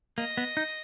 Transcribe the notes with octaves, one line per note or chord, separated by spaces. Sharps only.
A#3 D#5
B3
D#4